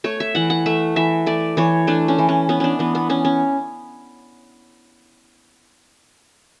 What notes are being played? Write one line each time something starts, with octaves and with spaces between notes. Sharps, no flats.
A3 C#5
E5
E3 F#5
F#5
A3 E5
E3 E5
A3 D5
E3 C#5
A3 D4
C#4
E3
C#4
B3 C#4
C#4 D4
E3 B3
B3
B3 C#4
C#4